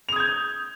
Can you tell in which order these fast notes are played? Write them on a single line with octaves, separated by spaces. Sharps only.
F7 D#6 G#6 G6